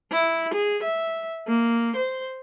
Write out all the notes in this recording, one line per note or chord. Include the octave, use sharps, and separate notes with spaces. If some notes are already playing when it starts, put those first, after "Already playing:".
E4
G#4
E5
A#3
C5